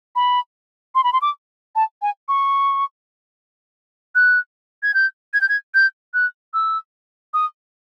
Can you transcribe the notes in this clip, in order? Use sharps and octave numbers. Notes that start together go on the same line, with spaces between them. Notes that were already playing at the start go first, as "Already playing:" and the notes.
B5
C6
B5
C6
D6
A5
G#5
C#6
F#6
G#6
G6
G#6
G6
G#6
G6
F#6
E6
D#6